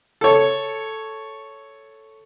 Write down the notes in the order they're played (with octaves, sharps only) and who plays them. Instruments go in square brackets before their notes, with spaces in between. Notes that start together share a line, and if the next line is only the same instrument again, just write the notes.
[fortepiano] A4 C#5